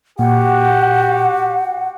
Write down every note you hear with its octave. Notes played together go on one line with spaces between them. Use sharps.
A#2 F#4 G4 F#5